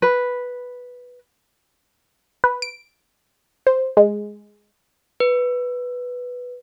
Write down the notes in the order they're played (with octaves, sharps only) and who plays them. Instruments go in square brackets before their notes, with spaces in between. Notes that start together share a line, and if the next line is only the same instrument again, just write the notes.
[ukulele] B4
[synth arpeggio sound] B4
D7
C5
G#3
[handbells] B4